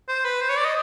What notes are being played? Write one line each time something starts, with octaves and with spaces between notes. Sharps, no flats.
C5
B4
C5
C#5
D5
D#5